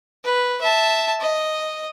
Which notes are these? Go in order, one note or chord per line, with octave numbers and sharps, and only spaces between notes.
B4
E5 A5
D#5